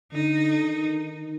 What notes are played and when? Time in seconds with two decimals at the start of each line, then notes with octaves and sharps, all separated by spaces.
0.13 D3 D#4
0.65 D#3